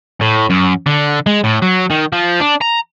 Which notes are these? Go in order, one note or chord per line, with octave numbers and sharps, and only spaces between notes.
A2
F#2
D3
G#3
A2
F#3
D#3
F3
D4
A#5